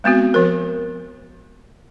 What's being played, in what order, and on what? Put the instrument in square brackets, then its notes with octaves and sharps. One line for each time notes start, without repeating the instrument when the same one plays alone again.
[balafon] G#3 B3 C4 F#4
F3 A#4